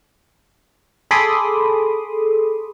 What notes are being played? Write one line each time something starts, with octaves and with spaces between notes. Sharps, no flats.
G#4 A4 B5 C6 D6 D#6